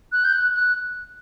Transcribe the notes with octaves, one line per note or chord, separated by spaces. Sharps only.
F#6
G6
F#6
F#6